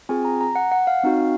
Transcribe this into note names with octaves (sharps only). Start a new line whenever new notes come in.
C4 F4 G#4 G#5
A#5
A#5
F#5
F#5
F5
C4 D#4 F#4